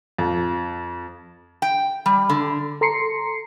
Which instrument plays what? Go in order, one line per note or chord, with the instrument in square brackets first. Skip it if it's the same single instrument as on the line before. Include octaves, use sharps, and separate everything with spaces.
[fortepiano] F2
[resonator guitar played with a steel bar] G5
G3
D3
[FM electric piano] A4 A#5 C6 C7 C#7